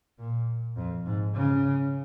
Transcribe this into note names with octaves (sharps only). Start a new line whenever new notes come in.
A#2
F2
G#2
C#3